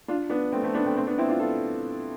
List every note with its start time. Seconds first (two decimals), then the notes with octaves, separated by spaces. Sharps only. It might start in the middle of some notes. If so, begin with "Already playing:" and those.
0.08 D4 F4
0.30 B3 D4
0.52 A3 C4
0.63 A3 C4
0.74 B3 D4
0.85 A3 C4
0.97 A3 C4
1.07 B3 D4
1.18 C4 E4
1.28 D4 F4
1.39 F4 A4